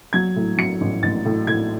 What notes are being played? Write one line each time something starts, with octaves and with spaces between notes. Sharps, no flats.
F#3 G#6
A2
F#3 C#7
A1
A1 A6
A2
A2 G#6